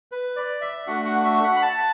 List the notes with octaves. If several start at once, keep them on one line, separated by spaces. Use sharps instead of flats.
B4
D5
E5
A3 D4 F#4 F#5
F#5
E5
F#5
B5
A5